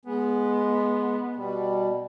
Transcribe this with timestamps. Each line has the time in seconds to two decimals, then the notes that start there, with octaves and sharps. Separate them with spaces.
0.05 G#3 B3
1.36 B2 G3